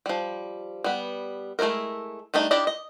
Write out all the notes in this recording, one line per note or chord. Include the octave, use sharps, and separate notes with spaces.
F3 G3
G3 B3
G#3 A3 D#4 E4 A#4
G3 A3 D4 D#4
D4 E4 G4 D5 D#5
D#5